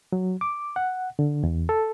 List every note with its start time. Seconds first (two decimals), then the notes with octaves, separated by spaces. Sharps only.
0.13 F#3
0.41 D6
0.76 F#5
1.19 D3
1.44 E2
1.69 A4